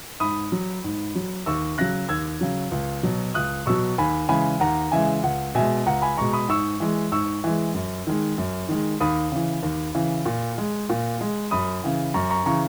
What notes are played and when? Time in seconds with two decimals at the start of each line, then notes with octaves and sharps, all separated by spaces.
0.20 G#2 B5 D#6
0.52 F#3
0.84 G#2
1.15 F#3
1.46 D#2 C#6 E6
1.78 C#3 F#3 F#6 A#6
2.09 D#2 E6 G#6
2.41 C#3 F#3
2.72 C#2
3.03 B2 F#3
3.34 C#2 D#6 F#6
3.66 B2 F#3 C#6 E6
3.98 D#2 G#5 B5
4.29 C#3 E3 G#3 G#5 B5
4.60 D#2 F#5 A#5
4.92 C#3 E3 G#3 E5 G#5
5.23 C#2 F#5
5.55 B2 G#3 E5 G#5
5.86 C#2 F#5 A#5
6.02 G#5 B5
6.17 B2 G#3 A#5 C#6
6.33 B5 D#6
6.49 G#2 C#6 E6
6.80 E3 G#3
7.12 G#2 C#6 E6
7.44 E3 G#3
7.74 F#2
8.07 D#3 G#3
8.38 F#2
8.69 D#3 G#3
9.00 D#2 B5 D#6
9.32 C#3 E3
9.63 D#2
9.95 C#3 E3
10.26 A#2
10.58 G#3
10.89 A#2
11.21 G#3
11.51 F#2 B5 D#6
11.84 C#3 E3
12.14 F#2 A#5 C#6
12.30 A#5 C#6
12.46 C#3 E3 A#5 C#6